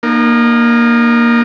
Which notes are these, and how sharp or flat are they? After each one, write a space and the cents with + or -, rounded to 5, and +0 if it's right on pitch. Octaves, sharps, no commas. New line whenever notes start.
A#3 +10 D#4 -35